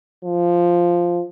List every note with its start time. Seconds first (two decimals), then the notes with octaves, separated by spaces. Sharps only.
0.25 F3